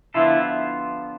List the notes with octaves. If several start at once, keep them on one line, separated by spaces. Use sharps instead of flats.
D3 F3 B3 E4 F4 A4